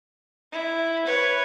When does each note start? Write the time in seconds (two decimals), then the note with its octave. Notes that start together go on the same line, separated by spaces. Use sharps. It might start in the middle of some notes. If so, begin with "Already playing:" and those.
0.52 E4
1.05 B4 C#5